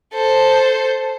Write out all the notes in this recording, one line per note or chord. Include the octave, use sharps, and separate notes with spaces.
A4 C5